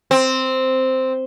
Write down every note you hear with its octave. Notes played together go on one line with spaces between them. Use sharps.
C4